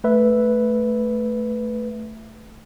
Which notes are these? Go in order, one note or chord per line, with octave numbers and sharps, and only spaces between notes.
A3 B4 E5